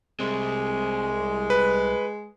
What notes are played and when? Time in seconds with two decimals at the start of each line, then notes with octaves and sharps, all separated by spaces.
0.20 C2 G#3 C4
1.50 B4